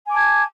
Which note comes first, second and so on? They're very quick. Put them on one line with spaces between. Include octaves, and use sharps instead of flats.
G#5 D6 A5 G#6